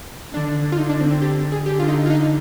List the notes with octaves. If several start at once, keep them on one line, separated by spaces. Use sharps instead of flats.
D3 D4
F4
D3 D#4
D4
C4
C4
G4
G#4
D3 G4
F4
D#4
F4
D#4